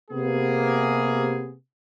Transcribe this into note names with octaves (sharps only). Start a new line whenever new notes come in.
C3 A#3 B3 G#4